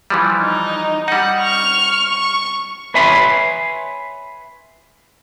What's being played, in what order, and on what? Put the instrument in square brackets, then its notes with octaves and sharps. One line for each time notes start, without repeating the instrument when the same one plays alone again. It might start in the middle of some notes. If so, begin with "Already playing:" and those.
[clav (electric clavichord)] E3 F3 G3
[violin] D#4
[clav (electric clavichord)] G3 D#4 [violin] F#5
[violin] C#6 F6
C#6
[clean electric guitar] B4 C#5 E5 G#5 B5 C6